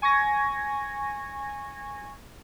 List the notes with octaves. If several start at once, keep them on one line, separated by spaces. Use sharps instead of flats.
G#5 C#6 G#6 A#6